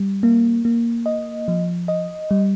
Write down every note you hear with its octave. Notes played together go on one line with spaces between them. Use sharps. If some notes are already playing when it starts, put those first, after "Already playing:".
Already playing: G3
A#3
A#3
D#5
F3
D#5
G3